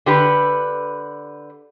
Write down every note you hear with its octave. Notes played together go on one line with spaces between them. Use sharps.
D3 G4 B4